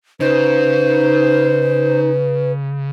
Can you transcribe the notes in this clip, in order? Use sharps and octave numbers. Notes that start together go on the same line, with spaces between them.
C#3 D#4 B4 C5